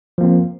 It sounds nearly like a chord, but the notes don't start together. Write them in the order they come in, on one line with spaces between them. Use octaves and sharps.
F3 A#3 C4